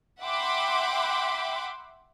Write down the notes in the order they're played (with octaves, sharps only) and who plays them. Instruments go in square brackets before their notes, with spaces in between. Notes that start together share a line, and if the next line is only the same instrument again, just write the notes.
[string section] E5 F#5 G5 B5 C6 D6